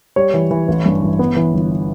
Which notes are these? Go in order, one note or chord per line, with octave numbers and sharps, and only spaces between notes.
G3 C#5
E3
E3
A1
G2
A1
B3
E3
G1